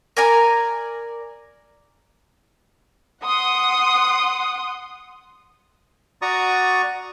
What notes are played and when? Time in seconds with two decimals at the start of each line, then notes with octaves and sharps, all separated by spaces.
0.17 A#4 D5 G#5 A#5
3.22 F#5 C6 D#6
6.22 F#4 D5 A#5 C#6 D#6